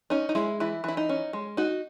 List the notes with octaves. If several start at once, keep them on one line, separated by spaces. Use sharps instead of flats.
C#4 D#4
D#4
G#3 E4
E3 E4
E3 E4
D#4
C#4
G#3
D#4 F#4